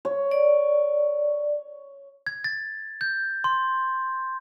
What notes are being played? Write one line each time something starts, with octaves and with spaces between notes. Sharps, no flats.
C#5
D5
G#6
A6
G6
C6